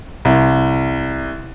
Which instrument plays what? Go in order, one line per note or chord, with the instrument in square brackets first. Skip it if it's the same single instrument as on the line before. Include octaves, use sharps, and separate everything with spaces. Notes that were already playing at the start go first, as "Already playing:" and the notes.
[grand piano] C2